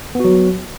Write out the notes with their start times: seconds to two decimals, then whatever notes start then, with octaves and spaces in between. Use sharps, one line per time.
0.15 B3
0.20 F#4
0.25 F#3